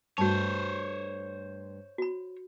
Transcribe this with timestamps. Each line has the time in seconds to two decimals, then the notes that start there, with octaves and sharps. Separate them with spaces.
0.18 G2 A3 F#4 C5 C#5 A5
1.98 F#4 B5